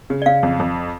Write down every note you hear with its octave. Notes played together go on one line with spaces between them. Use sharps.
C#3
D5
C#3 F5
F2
F2